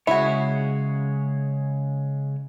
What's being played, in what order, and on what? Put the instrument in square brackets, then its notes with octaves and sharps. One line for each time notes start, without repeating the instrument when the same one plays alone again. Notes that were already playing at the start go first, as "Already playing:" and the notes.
[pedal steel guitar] C#3 G#3 C#5 [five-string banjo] E4 F#4